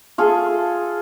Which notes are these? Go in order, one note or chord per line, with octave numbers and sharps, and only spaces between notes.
F4 G#4 A4